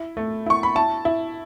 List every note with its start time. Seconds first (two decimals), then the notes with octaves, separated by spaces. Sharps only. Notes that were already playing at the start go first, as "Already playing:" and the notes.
Already playing: E4
0.17 A3
0.46 E4 C#6
0.63 B5
0.75 E4 A5
1.05 E4